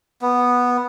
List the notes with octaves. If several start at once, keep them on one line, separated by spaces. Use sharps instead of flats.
B3